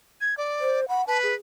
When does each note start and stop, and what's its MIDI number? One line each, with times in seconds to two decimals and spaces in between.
0.21 0.34 92
0.37 0.81 74
0.61 0.88 72
0.89 1.06 78
0.89 1.02 83
1.07 1.34 71
1.07 1.18 81
1.23 1.35 68